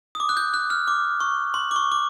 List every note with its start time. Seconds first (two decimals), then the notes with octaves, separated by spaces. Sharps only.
0.15 D#6
0.20 D6
0.29 F#6
0.37 G6
0.54 F#6
0.70 F6
0.88 D6
1.20 C#6
1.54 C6
1.71 D6
1.76 C#6
1.92 D6